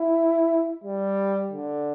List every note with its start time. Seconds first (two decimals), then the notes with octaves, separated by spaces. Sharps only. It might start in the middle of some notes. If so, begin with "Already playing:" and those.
Already playing: E4
0.84 G3
1.52 D3